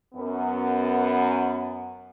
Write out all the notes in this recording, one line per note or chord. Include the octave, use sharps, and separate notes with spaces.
F#2 B3